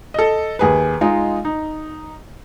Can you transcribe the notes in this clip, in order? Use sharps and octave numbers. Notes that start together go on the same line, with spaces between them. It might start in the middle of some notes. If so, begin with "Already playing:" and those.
A4 D#5
D#2 G#4 B4
G#3 D#4 F4
D#4